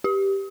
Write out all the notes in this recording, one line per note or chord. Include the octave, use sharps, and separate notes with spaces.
G4